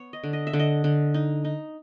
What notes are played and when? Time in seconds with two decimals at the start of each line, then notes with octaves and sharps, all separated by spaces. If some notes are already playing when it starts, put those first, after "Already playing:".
Already playing: B3 C#5
0.13 D#5
0.23 D3
0.33 D#5
0.47 E5
0.53 D3
0.59 D#5
0.84 D3
1.14 D#4
1.44 D#4